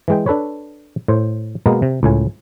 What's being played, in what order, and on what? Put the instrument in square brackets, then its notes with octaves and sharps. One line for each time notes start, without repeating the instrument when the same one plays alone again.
[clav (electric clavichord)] E3 G#3 G5
D4 A4 B4 C#5
A2 C5
B2 G#3 A#3 B3 A#4
C3
C#2 A2 G#5